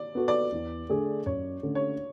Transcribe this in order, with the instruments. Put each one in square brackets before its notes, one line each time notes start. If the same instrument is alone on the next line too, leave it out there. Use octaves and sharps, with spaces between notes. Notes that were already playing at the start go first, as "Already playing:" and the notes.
Already playing: [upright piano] D5
[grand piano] B3 F#4 A4
[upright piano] D5
[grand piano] E2
D3 A3 D4 G#4
[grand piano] F#2 [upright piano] C#5
[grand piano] D3 A3 C#4
[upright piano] C#5